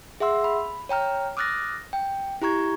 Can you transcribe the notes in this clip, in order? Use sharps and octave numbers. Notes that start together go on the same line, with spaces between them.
G#4 E5 F#5 C6 E6
B5
C#5 G5 A#5 F6
D6 D#6 F6 F#6 A6 A#6
G5
E4 G4 A#5 C#6 G#6